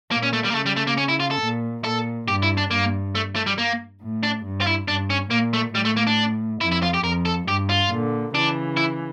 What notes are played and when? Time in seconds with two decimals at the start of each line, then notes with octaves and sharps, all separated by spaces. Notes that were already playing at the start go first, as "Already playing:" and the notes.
0.11 A#2 A#3
0.23 C#4
0.33 A3
0.45 G3
0.51 A#3
0.55 C#3 A3
0.66 G3
0.76 A3
0.87 A#3
0.98 C#4
1.09 E4
1.20 F4
1.31 A4
1.42 A#2
1.84 A#2 A4
2.28 G2 G4
2.43 E4
2.57 D4
2.71 G2 A#3
3.15 A3
3.36 A3
3.47 G3
3.58 A#3
4.01 A2
4.23 D4
4.45 G2
4.61 F4
4.67 E4
4.88 G2 D4
5.10 C#4
5.31 A#2 A#3
5.53 A3
5.74 A2 G3
5.85 A3
5.97 A#3
6.07 D4
6.61 F2 E4
6.72 E4
6.83 F4
6.94 G4
7.04 F2 A#4
7.25 A4
7.48 G2 G4
7.70 F4
7.91 A#2 D3
8.34 C#3 E3 D4
8.77 E4